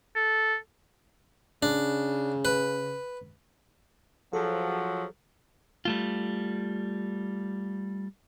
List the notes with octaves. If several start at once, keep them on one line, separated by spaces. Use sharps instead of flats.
A4
C#3 D4
B4
F3 F#3 G#4 A4
G3 A3 F4